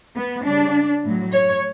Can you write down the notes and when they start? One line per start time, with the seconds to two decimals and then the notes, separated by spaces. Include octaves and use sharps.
0.16 B3
0.46 C#3 G3 D4
1.04 A2 F#3
1.32 C#5